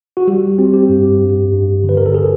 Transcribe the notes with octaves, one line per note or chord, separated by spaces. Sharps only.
F#4
G3 G4
C4
G4
G2
G2
G2
D3
B4
A#4
A4
G#4